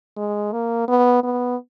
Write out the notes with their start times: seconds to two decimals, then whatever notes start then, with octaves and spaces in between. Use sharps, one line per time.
0.17 G#3
0.52 A#3
0.88 B3
1.23 B3